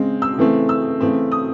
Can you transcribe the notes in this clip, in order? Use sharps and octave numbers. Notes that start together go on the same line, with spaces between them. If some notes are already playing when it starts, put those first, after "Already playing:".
Already playing: C#3 G#3 C4
E6
C#3 E3 A3 C4
E6
C#3 E3 A3 C4
D#6